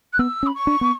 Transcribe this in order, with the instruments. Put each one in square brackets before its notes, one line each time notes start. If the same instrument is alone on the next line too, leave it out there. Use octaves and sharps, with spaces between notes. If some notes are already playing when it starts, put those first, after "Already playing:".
[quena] F#6
[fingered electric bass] B3 [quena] E6
[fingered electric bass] C#4
[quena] B5
C#6
[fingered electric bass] D4
B3